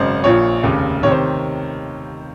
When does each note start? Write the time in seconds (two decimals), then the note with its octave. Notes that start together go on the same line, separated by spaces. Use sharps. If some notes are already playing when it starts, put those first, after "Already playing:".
Already playing: G#1 F#2 C#3 C5 D#5
0.24 A#1 A#2 F3 C#5
0.63 F1 D#2 C#3
1.03 C3 D#3 C#5
1.11 C5